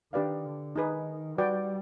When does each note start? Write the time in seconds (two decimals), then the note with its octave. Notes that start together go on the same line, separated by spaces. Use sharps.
0.13 D#3 D4 G4 B4 D5 F5
0.45 D3
0.75 D#3 D#4 G#4 B4
1.38 G3 F#4 B4 D5 G5